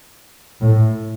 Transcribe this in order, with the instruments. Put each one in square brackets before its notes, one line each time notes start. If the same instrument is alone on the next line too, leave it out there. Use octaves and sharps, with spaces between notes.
[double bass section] A2